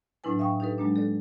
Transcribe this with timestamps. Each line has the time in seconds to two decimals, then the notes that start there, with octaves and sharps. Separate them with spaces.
0.24 A2 F#3 D4 E4 B4 G#5
0.39 E5 F5 G5 C#6 D#6
0.60 D#4 G4 A4 B4
0.78 F#3 G#3 A#3 D4
0.96 A4 D5